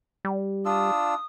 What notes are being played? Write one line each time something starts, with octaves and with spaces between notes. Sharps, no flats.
G3
D4 F4 D#6 E6